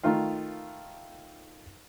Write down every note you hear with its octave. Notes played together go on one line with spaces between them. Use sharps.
D#3 A3 F4 F5